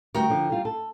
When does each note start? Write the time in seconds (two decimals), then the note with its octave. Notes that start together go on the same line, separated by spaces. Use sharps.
0.15 D2 G3 F#4 A#4 G5
0.30 D3 F3
0.50 G3 F4
0.65 A4